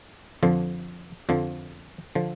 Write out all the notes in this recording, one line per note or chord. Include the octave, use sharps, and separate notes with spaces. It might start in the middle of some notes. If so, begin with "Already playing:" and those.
F2 D3 F3
F2 D3 F3
D3 F3